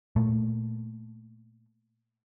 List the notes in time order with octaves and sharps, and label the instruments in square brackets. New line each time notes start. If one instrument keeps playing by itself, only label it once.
[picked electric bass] A#2 A3